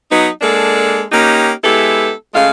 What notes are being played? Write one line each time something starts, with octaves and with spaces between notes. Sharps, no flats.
F#3 B3 D#4
G#3 A#3 D4 A4
A#3 C#4 D#4 G4
G#3 B3 E4 G4 A4
C#3 G#3 A3 F5